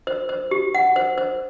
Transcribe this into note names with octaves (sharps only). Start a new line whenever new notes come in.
C5
C5
G4
F#5
C5
C5